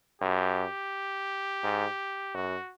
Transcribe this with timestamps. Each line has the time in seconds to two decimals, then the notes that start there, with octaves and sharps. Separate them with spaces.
0.21 F#2 G4
1.64 G#2
2.34 F#2 F#4